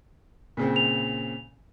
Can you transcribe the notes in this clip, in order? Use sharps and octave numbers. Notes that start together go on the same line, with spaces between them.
A#2 C#3 C4
F7